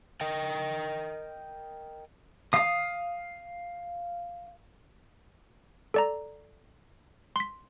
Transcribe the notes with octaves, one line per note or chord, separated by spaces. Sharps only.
A#4 D#5 G5
F5 D#6
A4 D5 A#5
C6 B6